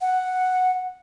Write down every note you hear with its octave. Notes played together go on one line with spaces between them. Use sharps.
F#5